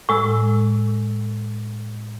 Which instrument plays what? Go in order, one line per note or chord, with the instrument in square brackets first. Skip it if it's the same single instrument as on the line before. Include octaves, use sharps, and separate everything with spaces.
[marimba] A2 G#3 E6